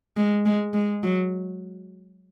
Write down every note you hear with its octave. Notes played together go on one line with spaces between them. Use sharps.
G#3
G#3
G#3
F#3